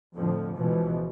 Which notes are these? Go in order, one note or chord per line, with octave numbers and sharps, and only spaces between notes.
F2 A2 D3 F3
C#2 B2 E3 F3